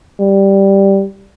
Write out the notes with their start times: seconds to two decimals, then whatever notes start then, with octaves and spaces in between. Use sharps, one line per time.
0.20 G3